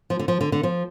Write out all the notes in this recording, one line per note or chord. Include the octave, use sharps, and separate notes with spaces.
F3
D3
F3
D3
D3
F3